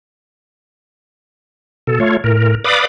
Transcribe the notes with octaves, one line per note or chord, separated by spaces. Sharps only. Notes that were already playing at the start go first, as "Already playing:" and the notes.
B2 A4
A3 F4 C#5
A2 A#4
B4 D5 F5 B5 D6 D#6